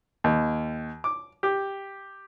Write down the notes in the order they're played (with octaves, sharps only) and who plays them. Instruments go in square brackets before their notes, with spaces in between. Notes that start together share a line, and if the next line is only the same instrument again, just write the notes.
[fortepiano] D#2
D6
G4